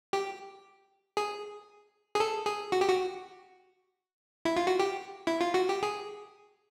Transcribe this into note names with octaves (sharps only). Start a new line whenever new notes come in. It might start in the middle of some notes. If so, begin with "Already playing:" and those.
G4
G#4
G#4
A4
G#4
F#4
G4
F#4
E4
F4
F#4
G4
E4
F4
F#4
G4
G#4